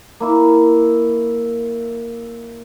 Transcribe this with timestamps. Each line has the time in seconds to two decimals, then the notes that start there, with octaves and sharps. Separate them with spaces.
0.20 A#3 E4